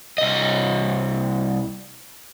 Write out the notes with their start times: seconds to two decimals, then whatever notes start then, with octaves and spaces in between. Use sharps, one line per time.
0.18 C2 D#5